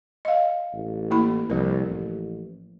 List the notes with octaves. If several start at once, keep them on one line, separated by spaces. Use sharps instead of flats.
D#5 F5
A1
A#3 E4 B5
C2 F3 A#4
A1